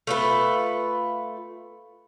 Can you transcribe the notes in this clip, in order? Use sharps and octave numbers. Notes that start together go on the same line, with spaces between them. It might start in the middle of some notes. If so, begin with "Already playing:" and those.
A3 F4 B4